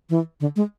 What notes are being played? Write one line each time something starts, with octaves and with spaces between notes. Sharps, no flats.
E3
D3
G#3